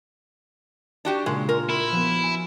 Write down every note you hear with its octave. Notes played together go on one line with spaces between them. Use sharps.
D4 F#4 G4
A#2 C#3 G#3 E7
F4 A#4
E4 C6
F3 B3 F#4
G#5 A6 D7